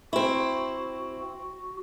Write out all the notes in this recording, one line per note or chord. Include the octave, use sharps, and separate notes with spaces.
C4 E4 F#4